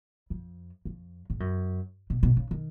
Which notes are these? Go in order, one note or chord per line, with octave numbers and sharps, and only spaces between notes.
F2
F2
G#2
F#2
B2
B2
C#3
D#3